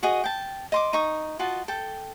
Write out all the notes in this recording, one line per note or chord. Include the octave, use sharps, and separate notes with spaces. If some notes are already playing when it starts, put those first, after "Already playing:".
F#4 G#4 D#5
G5 A5
D#5 C6 D6
D#4 C#6 D#6
F4 F#4 D#5 A5
A4 G5